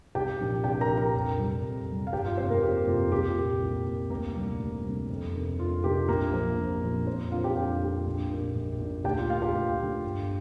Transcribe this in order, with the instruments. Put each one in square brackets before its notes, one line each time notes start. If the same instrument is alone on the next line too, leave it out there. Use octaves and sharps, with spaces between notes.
[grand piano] C2 G4 G5
A#2 F3 D4
C2 G4 G5
A#4 A#5
A#2 F3 D4
A#4 A#5
F2
C3 G3
F2
C3 G3
F5
G1 G4 G5
F4 F5
F2 C4 C5
C3
A#3 A#4
G1 G4
F2 C3 F4
C2 G4
A#2 A#3
C2
A#2 A#3
D2 A#3 A#4
C3 G3 C4
D2
C3 G3 C4
F2
C3 A#3 D4
F2 F4
C3 A#3 D4 G4
A#1 A#3 A#4
A#2 F3 C4
A#1
A#2 F3 C4
F2 C4 C5
D3 A#3 D4 F4 F5
G4 G5
F2 G4 G5
D3 A#3 D4
A#1
A#2 A#3 D4
A#1
A#2 A#3 D4
D2 G4 G5
F4 F5
D3 A#3 F4 F5
G4 G5
D2
D3 A#3
G1